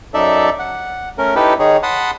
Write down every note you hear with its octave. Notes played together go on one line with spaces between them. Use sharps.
F#2 D#4 A4 D5 E5
F#5
A3 C#4 A#4
D#4 E4 G4 A4 B4
D#3 D#4 G#4 C#5
F#5 A5 B5 C6 D#6